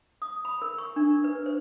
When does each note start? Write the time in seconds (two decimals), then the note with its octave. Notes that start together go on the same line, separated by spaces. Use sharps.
0.22 D#6
0.45 B5
0.62 A#4
0.78 C#6
0.96 D4
1.24 B4
1.46 C5